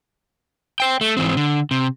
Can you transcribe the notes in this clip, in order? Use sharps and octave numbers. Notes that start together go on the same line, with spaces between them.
C5 G5
A3
G#2 E3 C4
D3
C3